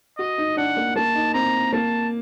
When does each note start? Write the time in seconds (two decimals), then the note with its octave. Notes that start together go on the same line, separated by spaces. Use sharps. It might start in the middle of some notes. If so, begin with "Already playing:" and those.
0.18 F#4 D#5
0.38 D#4
0.57 D4 F#5
0.77 A#3
0.96 A#3 A5
1.15 D#4
1.34 C4 A#5
1.73 A#3 A5